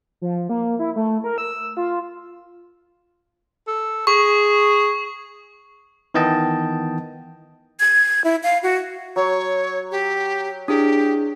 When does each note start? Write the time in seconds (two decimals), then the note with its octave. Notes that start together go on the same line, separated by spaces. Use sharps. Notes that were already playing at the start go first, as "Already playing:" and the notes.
0.22 F3
0.49 A#3
0.79 E4
0.96 A3
1.24 A#4
1.38 E6
1.77 F4
3.67 A4
4.07 G#4 C#6
6.14 D#3 E3 B3 D#5 G5 A5
7.80 G#6
8.24 E4
8.43 F5
8.63 F#4
9.16 F#3 C#5
9.91 G4
10.68 D4 E4 G4 G#4 D#6